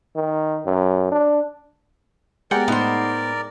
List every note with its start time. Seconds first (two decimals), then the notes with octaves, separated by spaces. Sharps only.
0.16 D#3
0.66 F#2
1.12 D4
2.51 G#3 B3 G4 G#4 A#4 D5 F#5 G5
2.68 A2 B3 D#4 C5